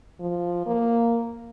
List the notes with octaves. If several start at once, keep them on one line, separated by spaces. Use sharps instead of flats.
F3
A#3